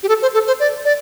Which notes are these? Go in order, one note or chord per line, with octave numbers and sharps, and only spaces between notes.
G4
A4
C5
A4
C5
D5
D5